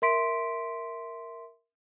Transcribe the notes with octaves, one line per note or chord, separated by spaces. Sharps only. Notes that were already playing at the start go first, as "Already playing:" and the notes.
A#4 E5 C6 B6 D7